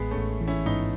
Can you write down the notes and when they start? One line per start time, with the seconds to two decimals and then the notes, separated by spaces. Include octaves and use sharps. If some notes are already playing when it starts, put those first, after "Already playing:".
Already playing: A1 G#3 B3
0.11 A3 C#4
0.17 A1
0.41 E3
0.48 C#4 E4
0.66 G#2 B3 D#4